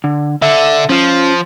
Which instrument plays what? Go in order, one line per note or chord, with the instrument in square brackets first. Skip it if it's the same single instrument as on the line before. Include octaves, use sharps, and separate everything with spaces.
[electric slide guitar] D3
[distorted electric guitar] D3 [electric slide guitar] E5
[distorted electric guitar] F3 [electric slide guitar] C#4 F4